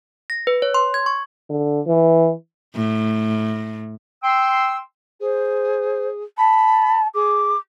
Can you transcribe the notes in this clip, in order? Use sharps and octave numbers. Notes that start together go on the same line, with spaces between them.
A#6
B4
C#5
C6
G#6
C#6
D3
E3
A2
G5 C6 E6
G#4 C5
A5 B5
G#4 D6